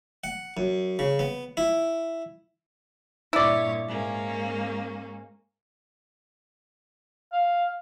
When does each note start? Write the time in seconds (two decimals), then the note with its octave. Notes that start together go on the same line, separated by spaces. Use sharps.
0.24 F#5
0.57 F#2
0.99 C#3
1.19 B3
1.57 E4
3.33 G2 A#2 E4 C#5 D5
3.87 G#2 A#3 C#4
7.33 F5